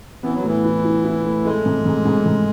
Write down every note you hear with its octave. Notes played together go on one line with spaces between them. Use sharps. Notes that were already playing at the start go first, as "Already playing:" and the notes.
E3 B3
F#3
A2 E3
E4
E4
E4
A2
G#3 A3
G#2
G#2
G#2
G#2